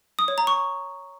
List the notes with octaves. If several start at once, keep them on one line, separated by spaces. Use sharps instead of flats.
D#6
C#5
A#5
C#6